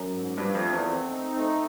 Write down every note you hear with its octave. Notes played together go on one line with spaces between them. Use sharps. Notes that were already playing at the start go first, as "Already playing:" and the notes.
Already playing: F#2
G#2
G2 F3
F2
A3
E2
C4
D#4
A3